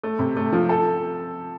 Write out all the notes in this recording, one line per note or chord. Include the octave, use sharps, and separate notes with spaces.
A3
C3
A3
F3
A4